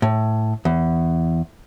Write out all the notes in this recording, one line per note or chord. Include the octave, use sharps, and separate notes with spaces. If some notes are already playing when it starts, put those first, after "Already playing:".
A2
E2